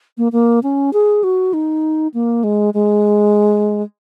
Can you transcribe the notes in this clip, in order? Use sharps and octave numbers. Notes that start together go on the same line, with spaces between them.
A#3
A#3
C#4
G#4
F#4
D#4
A#3
G#3
G#3